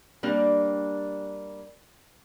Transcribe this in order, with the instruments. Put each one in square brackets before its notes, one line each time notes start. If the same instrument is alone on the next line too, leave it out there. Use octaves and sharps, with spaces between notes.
[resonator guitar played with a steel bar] G3 A#3 D4